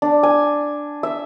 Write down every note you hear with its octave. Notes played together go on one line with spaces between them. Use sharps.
D4
G#5
E5